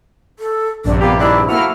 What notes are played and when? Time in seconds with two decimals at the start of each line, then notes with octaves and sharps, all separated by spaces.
0.39 A4
0.84 A#1 G2 C3 D4
1.01 A#3 B3 F4 G4
1.19 D#2 G#3 D4 E4
1.48 F3 A3 A#3 E4 F#4 F6